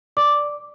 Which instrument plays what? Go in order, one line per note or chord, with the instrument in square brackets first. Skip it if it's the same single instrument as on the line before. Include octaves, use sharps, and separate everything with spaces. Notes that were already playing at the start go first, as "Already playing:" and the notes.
[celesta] D5 D6